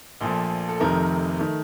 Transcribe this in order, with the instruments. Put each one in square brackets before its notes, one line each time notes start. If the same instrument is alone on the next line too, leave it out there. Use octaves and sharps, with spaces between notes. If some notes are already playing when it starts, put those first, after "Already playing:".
[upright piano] A#1 A#2 F3 A3
A4
F1 F2 C3 D#3 A#4
D#3 A3